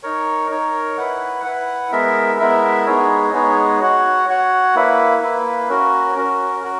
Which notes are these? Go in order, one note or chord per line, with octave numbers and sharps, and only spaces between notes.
D#4 A#4 C#5
D#4 A#4 C#5
E4 B4 F#5
E4 B4 F#5
G#3 B3 E4 A#4 E5
G#3 B3 E4 A#4 E5
G#3 B3 D#4 G#4 C#5
G#3 B3 D#4 G#4 C#5
F#4 C#5 F#5
F#4 C#5 F#5
A#3 E4 B4
A#3 E4 B4
C#4 F#4 A#4
C#4 F#4 A#4
F#4 A#4